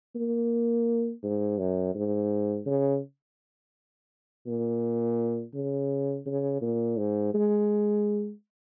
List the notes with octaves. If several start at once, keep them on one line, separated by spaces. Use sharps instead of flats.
A#3
G#2
F#2
G#2
C#3
A#2
C#3
C#3
A#2
G#2
G#3